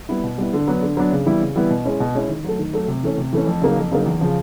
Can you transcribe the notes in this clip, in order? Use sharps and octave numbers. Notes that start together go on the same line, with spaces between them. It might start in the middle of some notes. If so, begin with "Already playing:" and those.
G3 B3 E4
B2
G3 B3 E4
D3
F#3 B3 D4
D3
F#3 B3 D4
C#3
E3 G3 B3 E4
C#3
E3 G3 B3 E4
B2
G#3 C#4 E4
B2
G#3 C#4 E4
D#3
F#3 A3
D#3
F#3 A3
C3
E3 A3 C#4
C3
E3 A3 C#4
F2
C#3 F#3 A#3 D#4
F2
C#3 F#3 A#3 D#4
E2
C#3 F3